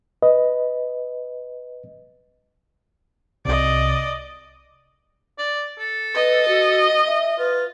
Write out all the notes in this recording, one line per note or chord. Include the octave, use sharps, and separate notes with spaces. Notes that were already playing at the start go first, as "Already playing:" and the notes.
B4 D#5
C2 C3 D5 D#5
D5
A4
B4 D#5
F#4
E5
F4 B4